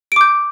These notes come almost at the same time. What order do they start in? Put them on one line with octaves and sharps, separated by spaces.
D7 D6 G6